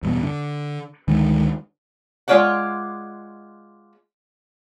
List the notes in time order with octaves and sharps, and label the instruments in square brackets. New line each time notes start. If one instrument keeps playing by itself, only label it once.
[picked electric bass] E2 G2 B2
D3
D2 D3 D#3 G#3
[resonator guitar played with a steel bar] G#3 F4 C#5 D5 F#5